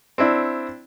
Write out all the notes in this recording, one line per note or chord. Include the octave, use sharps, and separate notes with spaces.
C4 D4 E4